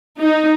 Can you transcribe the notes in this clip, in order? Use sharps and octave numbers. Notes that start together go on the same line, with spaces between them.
D#4